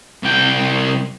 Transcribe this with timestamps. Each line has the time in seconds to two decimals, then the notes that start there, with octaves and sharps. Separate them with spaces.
0.23 C2 G5